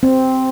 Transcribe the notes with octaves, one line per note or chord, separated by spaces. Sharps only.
C4